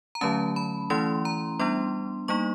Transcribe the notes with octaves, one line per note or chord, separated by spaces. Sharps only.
A#5
D3 F#3 A3 C#4 A5
B5
E3 A3 C#4 E4 C6
A#5
G3 B3 D4 C6
G3 A#3 D#4 C#6